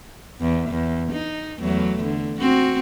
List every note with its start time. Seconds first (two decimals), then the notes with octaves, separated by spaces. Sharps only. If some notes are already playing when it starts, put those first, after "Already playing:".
0.40 E2
0.69 E2
1.12 D#4
1.60 E2 F#3 A3
2.03 D3
2.40 C4 F#4